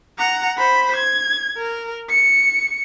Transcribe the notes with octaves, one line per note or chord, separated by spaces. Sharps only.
F#5 A#5
C5 B5
G#6
A#4
C#7